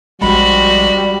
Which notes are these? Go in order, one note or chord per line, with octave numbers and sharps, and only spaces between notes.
A#1 G3 G#3 F#4 B5